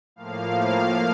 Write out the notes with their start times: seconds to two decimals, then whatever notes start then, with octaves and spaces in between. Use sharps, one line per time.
0.16 A2 F3 A#3 F5
0.83 F5